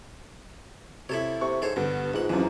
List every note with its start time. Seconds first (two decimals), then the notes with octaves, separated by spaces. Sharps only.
1.09 C3 E4 A4 C#5
1.41 C3 C#6
1.62 G#2 A4 C5 C#5
1.76 G2 D3 B3
2.14 A#1 G#2 F#5
2.30 F#2 E3 F3